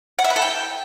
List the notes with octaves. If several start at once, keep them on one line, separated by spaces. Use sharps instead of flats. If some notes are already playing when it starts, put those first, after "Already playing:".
F#5
E5
B4
A4
G5